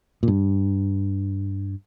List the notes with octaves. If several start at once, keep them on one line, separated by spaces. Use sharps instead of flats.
A#2
G2